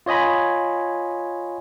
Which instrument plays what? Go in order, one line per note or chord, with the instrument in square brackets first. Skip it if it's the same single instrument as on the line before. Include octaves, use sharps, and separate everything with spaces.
[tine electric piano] F4 C#5 D#5 G#5 B5